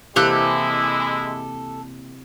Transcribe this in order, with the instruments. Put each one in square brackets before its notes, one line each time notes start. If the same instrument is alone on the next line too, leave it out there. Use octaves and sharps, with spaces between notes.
[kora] C3 E3 A#3 [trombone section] G#3 E4 [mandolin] G4 A4 F#6